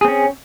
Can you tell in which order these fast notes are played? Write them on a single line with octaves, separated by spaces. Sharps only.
G#4 C4 C#4